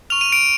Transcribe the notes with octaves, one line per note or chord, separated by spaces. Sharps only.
C#6 F6 F7
D#7
D7